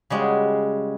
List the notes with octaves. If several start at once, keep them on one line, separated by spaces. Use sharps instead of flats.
C#3 G3 G#3 F#4